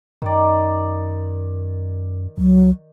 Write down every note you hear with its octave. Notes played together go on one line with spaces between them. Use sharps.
F#2 D#3 D5
C#2 F#3